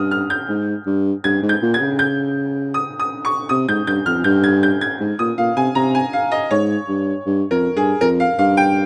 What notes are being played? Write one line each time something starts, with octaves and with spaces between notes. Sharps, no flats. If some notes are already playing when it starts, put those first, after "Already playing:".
Already playing: G2 D#6 F6
F6
G6
G#2
G2
G2 G#6
G#2
G6
A#2
G#6
C#3
G6
D#6
D#6
C#6
C3 D#6
G#2 G6
G2 G6
F2 F6
G2 G6
G#6
G6
G#6
G#2
A#2 D#6
A#2 F5
C3 G#5
C3 A#5
G#5
F5
D#5
G#2 C#5
G2
G2
F2 A#4
G2 G#4
F2 A#4
F5
G2 F5
G5